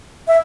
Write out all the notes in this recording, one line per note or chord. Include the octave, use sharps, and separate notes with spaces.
E5